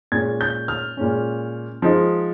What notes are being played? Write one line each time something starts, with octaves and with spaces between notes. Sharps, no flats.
A#2 G#3 C#4 G#6
G6
F6
A#2 G#3 C#4
F3 G#3 D#4